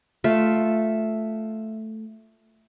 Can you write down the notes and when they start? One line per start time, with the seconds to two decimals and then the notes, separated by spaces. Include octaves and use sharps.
0.24 A3 F4 E5